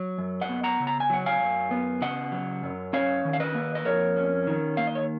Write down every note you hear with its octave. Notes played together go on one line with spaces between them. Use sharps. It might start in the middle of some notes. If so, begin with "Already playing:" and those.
Already playing: F#3
F#2
D#5 F#5
B3
F#5 A#5
C#3
A#5
G#5
F#3 F#5
F5 G#5
F#2
B3
C#3 D#5 F#5
F#3
F#2
C#4 C#5 F5
D#3
F5
B4 D#5
A#3
D#5
F2 A#4 C#5
C#4
D#3
A#3 F5
D#5
C#5